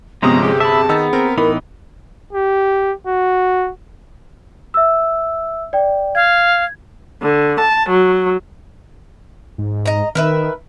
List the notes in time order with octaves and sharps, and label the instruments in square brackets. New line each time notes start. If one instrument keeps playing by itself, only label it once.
[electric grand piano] G1 C3 D#6 [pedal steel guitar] F3 G#3 C#4 [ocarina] B3 [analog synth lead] A#5
[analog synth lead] G4 [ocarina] G#4
[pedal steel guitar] E5 B5 [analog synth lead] A5
[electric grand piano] D#3 D#4 E6 [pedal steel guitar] B3
[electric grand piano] C4 [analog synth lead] A#4
[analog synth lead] A2 [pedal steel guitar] E3 B3 D#4 [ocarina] A#4 [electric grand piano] B5
[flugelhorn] G4
F#4
[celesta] E5 E6
D5 G5
[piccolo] F5 [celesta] G#6
[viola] D3
A5
F#3
[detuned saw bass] G#2
[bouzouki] D#5 A#5
[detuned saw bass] D#3 [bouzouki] A#4 B4 E5